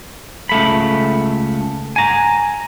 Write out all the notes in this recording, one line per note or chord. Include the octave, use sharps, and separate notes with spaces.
C#2 A3 B5
G#5 A#5